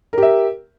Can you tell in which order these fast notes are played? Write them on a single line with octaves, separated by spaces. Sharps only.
A#4 G4 E5